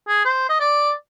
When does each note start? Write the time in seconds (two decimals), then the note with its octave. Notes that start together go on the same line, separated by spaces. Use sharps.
0.08 G#4
0.25 C5
0.49 D#5
0.60 D5